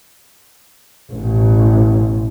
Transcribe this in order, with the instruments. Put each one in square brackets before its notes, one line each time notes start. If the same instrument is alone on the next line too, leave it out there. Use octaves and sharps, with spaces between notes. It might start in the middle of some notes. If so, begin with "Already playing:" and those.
[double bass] A1 B2